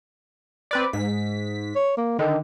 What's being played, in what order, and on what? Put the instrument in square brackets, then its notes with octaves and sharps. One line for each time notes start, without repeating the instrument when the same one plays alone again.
[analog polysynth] C4 B4 D5
G#2 B6
[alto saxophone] C#5
A#3
[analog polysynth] D3 [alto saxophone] D#3